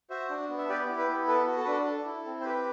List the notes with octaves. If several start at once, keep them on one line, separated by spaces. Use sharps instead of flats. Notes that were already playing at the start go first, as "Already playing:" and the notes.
F#4 C5 E5
D4
B3
E5
G4 B4 D5
E4
B4
B3
A4 B4
F#4
A4
B4
D4 A4
A4
E4
C4
C5
G4 B4